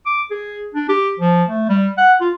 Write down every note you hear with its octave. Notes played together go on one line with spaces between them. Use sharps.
D6
G#4
D4
G4
F3
A3
G3
F#5
F4